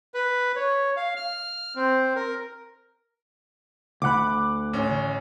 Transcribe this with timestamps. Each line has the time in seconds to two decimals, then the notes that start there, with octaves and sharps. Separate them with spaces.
0.14 B4
0.56 C#5
0.97 F5
1.16 F6
1.76 C4
2.16 A#4
4.02 D2 F#5 B5 D6 F#6
4.73 A1 C#4